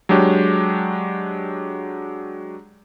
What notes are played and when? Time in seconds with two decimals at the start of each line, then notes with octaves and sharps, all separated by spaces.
0.09 F#3 G#3 D4 G4 C#5